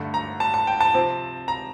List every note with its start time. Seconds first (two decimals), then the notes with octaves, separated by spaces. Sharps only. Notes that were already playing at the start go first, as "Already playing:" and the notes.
Already playing: G2 D3 A3
0.14 A#5
0.40 A5
0.54 A5
0.67 G5
0.80 A5
0.94 C3 F3 C4
1.48 A#5